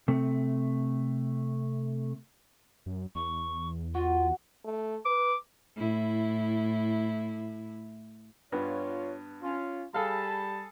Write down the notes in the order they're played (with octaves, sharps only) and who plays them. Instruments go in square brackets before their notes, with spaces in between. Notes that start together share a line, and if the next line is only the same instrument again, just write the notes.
[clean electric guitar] C3 A3
[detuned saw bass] F#2
[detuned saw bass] E2 [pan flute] C#6
[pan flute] F4 [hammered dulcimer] F#4
[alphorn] A3
[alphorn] B4 [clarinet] D6
[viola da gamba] A2 E4
[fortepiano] G2 B3 [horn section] F4 C#5
[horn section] C#4 F4
[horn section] G3 A5 B5 [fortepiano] G#4 A4 F5